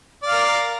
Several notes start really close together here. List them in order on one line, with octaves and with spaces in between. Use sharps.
D5 F5 A#4